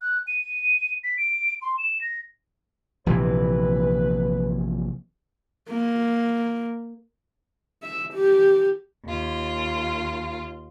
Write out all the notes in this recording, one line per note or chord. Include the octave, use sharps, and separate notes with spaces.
F#6
D#7
B6
D7
C6
E7
A#6
A#1 C3 E3 B4
A#3
E5
G4
D#2 F4